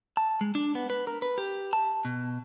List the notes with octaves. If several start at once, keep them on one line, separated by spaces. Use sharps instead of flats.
A5
G#3
D4
B3
B4
A#4
B4
G4
A5
B2